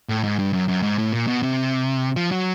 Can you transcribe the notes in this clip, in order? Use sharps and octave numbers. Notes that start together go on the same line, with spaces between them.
A2
G#2
G2
F#2
F#2
G#2
A2
A#2
B2
C3
F3
F#3